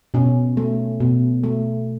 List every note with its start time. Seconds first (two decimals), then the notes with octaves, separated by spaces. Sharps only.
0.14 B2 C#4
0.57 A3
1.00 B2
1.44 A3